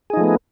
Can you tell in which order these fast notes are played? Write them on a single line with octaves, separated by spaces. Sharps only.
G#4 D#4 F3 A3 B3